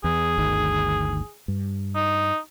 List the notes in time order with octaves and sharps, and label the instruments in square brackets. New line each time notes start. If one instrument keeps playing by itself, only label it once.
[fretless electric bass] E2 [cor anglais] G#4
[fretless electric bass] G1 D2 D#3
G2
[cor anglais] D#4